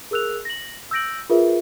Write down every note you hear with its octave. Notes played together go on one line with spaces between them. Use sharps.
G#4 A#4 E6 F#6 F7
A#6 F#7
E6 G6 A#6 D7 F#7
F4 G#4 A#4 B4 E5